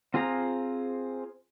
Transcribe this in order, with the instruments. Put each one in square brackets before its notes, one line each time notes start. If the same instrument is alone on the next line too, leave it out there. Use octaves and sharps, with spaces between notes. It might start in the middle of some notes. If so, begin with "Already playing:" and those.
[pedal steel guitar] C4 F4 G#4 C5 A#5